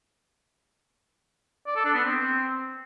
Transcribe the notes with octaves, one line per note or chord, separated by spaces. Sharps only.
D5
A4
D4
B3
C4